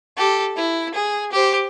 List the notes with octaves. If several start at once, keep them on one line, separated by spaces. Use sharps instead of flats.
G4 A4
E4
G#4
G4 C5